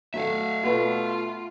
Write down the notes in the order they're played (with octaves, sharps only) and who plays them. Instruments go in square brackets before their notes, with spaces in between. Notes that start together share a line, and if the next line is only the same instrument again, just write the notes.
[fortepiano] F#3 A3 [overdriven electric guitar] E5 F5
[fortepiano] B2 A3 B3 [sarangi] F4